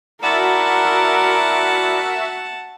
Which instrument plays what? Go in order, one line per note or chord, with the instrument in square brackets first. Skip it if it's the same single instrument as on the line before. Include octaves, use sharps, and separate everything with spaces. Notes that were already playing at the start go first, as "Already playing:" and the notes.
[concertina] E4 D5 [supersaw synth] F#4 E5 [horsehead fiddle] A#4 [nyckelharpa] F#5 A5